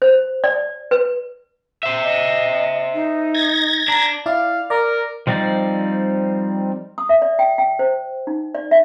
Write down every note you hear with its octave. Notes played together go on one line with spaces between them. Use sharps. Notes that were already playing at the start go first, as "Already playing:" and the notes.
C5
D5
B4
C5 E5
D#5
D#4
G#6 A#6
D4 A#5
E4 D5 F5
A#4 D5 A#5
F3 G3 C4 D#4 D5
D#6
E5
D5
G5
G5
C5
D#4
D5
E5